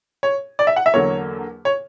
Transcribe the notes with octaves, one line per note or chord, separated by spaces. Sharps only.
C#5
D5
E5
F#5
E5
E2 D3 F#3 A#3 C#5
C#5